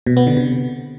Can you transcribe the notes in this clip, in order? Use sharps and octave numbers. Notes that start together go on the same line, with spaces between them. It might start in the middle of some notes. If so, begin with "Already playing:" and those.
B2
B3
D3
C3